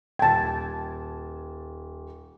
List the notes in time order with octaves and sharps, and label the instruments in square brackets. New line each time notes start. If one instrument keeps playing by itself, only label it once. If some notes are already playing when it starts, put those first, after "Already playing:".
[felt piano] D#1 G#6 [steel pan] G5 A5